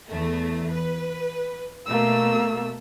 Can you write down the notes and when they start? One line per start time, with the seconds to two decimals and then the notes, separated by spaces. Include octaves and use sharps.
0.10 E2 A3
0.71 B4
1.87 B2 A3 A#3 E6